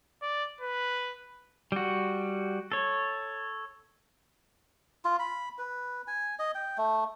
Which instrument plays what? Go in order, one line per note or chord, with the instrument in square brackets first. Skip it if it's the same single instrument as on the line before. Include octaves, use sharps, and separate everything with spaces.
[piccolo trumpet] D5
B4
[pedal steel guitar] G3 F#4
A4 C#5
[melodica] F4
B5
B4
G#5
D#5
G5
A3